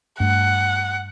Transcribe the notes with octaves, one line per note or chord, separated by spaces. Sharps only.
G2 A3 F#5